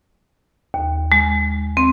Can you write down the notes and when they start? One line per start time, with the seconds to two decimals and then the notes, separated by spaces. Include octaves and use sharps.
0.74 D#2
1.12 G#3
1.77 C4